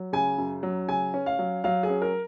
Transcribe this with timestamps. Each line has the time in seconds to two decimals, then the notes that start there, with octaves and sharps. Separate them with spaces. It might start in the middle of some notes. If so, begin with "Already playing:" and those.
Already playing: F#3
0.13 C#3 G#5
0.38 F#2
0.63 F#3
0.88 C#3 G#5
1.14 C#4
1.26 F5
1.39 F#3
1.64 F#3 F5
1.83 G#4
1.89 C#4
2.02 A#4